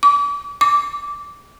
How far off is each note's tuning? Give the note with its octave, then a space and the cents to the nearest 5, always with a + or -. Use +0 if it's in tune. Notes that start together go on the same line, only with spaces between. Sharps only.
D6 -40
D6 -15